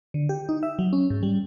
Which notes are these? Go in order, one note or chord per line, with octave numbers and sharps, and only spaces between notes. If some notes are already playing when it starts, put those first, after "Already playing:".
D3
G4
D#4
E5
F#3
C#4
G#2
G3